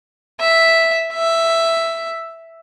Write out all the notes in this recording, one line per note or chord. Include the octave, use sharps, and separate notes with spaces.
E5
E5